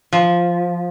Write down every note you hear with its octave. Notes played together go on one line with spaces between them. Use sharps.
F3